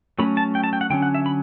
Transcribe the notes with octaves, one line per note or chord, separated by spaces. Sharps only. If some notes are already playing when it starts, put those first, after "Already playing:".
F#3 A3 C#4 B5
A5
G5
A5
G5
F#5
D3 F#3 C#4 G5
F#5
E5
B5